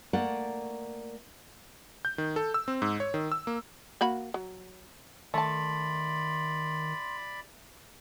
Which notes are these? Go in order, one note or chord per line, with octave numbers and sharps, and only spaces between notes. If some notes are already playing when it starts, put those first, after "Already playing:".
A3 A#3 D5 F#5
G6
D#3
A4
E6
C4
G#2
C#5
D#3
E6
A#3
A#3 F#4 B5
F#3
D#3 A3 D5 A5 B5 C6